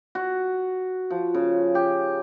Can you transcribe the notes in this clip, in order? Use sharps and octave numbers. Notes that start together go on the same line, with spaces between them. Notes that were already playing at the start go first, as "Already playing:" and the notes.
F#4
F3
C#3
G4